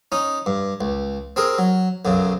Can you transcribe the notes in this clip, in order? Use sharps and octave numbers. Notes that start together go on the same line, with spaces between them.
C#4 D#4
G2
C#2
C4 G#4 A#4
F#3
B1 F#2 C#3